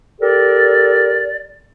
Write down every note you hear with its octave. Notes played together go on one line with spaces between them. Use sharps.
G4 A4 A#4 D5